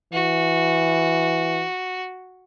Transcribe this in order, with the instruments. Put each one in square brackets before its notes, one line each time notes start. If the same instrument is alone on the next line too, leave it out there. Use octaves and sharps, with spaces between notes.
[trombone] E3 [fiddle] F#4